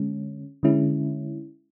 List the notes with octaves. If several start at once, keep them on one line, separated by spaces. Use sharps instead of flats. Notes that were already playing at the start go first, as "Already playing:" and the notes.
Already playing: D3 G#3 C#4
D3 G#3 C#4 E4